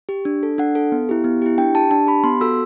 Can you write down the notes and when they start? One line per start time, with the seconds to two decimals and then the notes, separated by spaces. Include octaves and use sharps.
0.09 G4
0.25 D4
0.43 A4
0.58 D4 F#5
0.75 A4
0.92 B3
1.09 E4 G4
1.24 B3
1.42 E4 G4
1.58 D4 G5
1.75 G4 A5
1.91 D4 A5
2.07 G4 B5
2.24 B3 C6
2.41 F#4 A4 E6